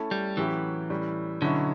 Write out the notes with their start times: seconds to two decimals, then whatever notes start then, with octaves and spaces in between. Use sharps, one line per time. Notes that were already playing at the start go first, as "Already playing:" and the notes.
Already playing: A3 C#4 E4 A4
0.11 G3
0.37 A2 E3 F#3 C#4 E4 G4
0.90 A2 G3 C#4
1.42 B2 D3 F#3 C#4 E4